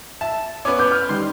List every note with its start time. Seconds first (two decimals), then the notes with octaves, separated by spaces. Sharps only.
0.21 E5 A5
0.65 B3 C#4 D6
0.79 B4 D6 G6
0.92 F6
1.09 D#3 G3 C6